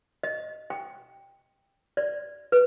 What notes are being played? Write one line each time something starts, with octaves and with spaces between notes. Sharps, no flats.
D#5
G5
D5
B4